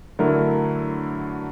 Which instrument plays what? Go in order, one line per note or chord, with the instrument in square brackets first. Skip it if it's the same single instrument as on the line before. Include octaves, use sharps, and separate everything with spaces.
[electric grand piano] D3 F#3 A3 D4 E4 A#4